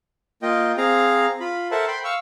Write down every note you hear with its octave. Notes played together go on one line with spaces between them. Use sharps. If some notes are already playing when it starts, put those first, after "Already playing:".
A#3 F4 D#5 G5
C4 G#4 F5 A#5
F4 B5
A4 A#4 C5 E5 F#5 A5
G5 B5 C6
F5 C#6 E6